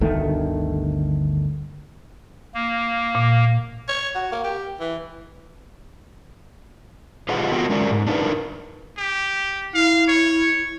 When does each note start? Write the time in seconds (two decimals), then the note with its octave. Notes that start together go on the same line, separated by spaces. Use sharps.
0.01 G1 D2 D#3 A3
2.54 A#3
3.15 A#2
3.88 C#5
4.15 F#4
4.32 A#3
4.44 G4
4.80 E3
7.29 F4 G4 G#4 B4 D#5 F#5
7.52 B3 F4 F#4 A#4 D#5 G5
7.70 G#3 C#4 A#4 D5
7.90 G#2
8.07 D4 D#4 F4 G#4 A#4 B4
8.97 G4
9.74 E4 F5
10.08 C#5